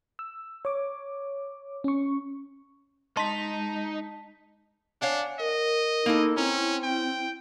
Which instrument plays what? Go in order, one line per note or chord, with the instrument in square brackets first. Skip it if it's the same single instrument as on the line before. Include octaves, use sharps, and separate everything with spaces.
[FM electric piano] E6
C#5 D6
C#4 C#6
[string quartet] G#3 [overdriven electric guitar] D#4 [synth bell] A5 B6 [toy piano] C6
[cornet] D4 [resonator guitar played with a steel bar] C#5 F5 F#5 [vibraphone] G#5
[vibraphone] A#4 [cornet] D#5
[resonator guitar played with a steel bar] A#3 E4 A4 [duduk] D#4
[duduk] C4 [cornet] C#4 [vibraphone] E4 [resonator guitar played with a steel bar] A#5
[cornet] G5